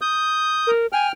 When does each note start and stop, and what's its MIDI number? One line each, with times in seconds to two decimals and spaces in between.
0.01 0.71 87
0.01 0.71 91
0.67 0.87 70
0.92 1.12 79
0.92 1.08 80
0.92 1.12 89